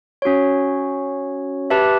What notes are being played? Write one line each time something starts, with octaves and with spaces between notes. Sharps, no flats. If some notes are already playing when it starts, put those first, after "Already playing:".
C#4 F#4 C#5
G4 B4 E5 A5